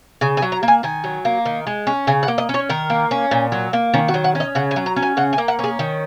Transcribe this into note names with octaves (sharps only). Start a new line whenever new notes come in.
C#3 G#5
G#5
F#3
A#5
A#3
G#5
D#3 G#5
F#3
A#3
D#3
G#3
C#4
C#3 G#5
F#5
A#3
D#5
C#4
C#5
D#3 A#4
A#3
C#4
A#2
F#3
A#3
D#3 C#4
F#4
F#3
F#5
C#4
D#5
C#3 F#5
G#5
F#3
A#5
C#4
G#5
C#3 F#5
G#5
A#3
F#5
C#4 G#4
D#3